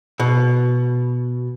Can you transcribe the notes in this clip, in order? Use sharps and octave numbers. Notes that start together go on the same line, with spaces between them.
B2